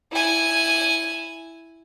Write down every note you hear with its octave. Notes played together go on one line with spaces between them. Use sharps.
E4 G#5